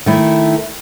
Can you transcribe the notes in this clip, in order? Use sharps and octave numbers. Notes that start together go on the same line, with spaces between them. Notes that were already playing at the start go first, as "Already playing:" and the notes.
D#3 A3 E4